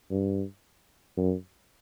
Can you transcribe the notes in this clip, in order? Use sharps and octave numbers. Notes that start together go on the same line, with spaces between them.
G2
F#2